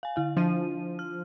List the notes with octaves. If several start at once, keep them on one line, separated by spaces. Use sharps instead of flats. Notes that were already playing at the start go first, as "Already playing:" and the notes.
F5 G#5
D3 E4 F5
F3 D4 D#7
F6